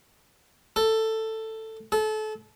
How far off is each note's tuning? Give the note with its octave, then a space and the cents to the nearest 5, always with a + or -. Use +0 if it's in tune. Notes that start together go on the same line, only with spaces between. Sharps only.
A4 +10
A4 -30